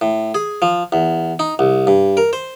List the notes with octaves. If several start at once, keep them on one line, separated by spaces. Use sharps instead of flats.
A2
G#4
F3
E2
D#4
C2
G2
A#4
C5